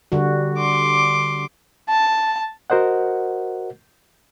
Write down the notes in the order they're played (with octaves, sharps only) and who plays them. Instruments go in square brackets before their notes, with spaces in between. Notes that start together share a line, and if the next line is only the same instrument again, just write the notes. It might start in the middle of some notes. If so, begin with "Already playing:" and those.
[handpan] D3 G3 F#4
[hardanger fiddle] C6 D6
[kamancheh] A5
[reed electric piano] F#4 A#4 C5 D#5 F#5